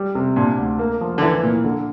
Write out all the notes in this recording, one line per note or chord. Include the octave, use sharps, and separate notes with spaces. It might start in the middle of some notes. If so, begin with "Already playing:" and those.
Already playing: G3
C3
A#2 D4
D2
A#3
F3
D3
E3 E4
A#2
D3